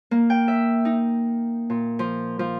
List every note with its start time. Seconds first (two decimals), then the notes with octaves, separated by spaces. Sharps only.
0.11 A#3
0.30 G5
0.48 E5
0.85 D#4
1.70 A#2
1.99 F3
2.39 F3